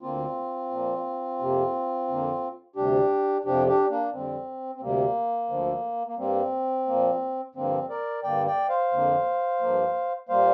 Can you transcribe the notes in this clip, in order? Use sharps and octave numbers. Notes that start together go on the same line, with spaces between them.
D2 D3 A#3 C4 F4
A#2 F3 A#3
F2 C3 A#3
F2 D3 A#3
D2 C3 G3 D4 G4
F2 C3 F3 D4 G4
D4 G4
A#3 D4
F2 D3 G3 C4
C4
D2 C3 G3 A#3
D2 D3 F3
A#3
G2 G3 A#3 C4
A#2 F3 A#3
G2 D3 F3 A#3 C4
A#4 D5
G2 D3 A#3 D5 G5
D5 G5
C5 F5
F2 D3 A#3
G2 F3 A#3
A#2 G3 A#3 C5 F5